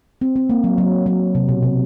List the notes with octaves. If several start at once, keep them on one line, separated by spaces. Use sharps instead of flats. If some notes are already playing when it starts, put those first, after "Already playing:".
C4
C4
A#3
F#3
F#3
F#3
C3
B2
C3